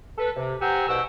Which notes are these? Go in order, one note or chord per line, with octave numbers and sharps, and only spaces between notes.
A4 B4
C3
G4 C5 F#5 G#5 A#5 E6
C2 B2 B4 F#5 G5 E6